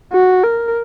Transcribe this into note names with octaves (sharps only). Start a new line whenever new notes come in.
F#4
A#4